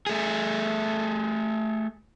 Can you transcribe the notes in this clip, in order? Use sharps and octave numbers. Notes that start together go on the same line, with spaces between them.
A3 G#4